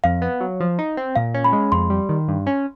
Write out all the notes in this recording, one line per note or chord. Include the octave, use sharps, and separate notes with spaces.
F2 F5
B3
F#3
F3
D#4
C4
A#2 F5
C#4
B5
G#3
F2 C6
G3
D#3
G2
C#4